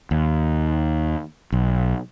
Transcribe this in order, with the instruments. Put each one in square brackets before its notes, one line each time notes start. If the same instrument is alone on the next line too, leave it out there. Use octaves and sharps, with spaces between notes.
[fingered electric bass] D#2
B1